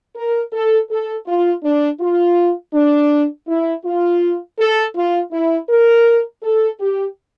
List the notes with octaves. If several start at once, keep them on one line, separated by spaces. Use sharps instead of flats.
A#4
A4
A4
F4
D4
F4
D4
E4
F4
A4
F4
E4
A#4
A4
G4